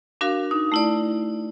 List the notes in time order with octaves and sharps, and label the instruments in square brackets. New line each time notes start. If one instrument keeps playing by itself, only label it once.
[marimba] D4 F#4 A#4 F5
D#4
A3 E4 D5